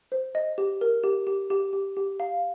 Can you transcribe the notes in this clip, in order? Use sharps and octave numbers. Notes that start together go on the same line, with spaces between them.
C5
D#5
G4
A#4
G4
G4
G4
G4
G4
F5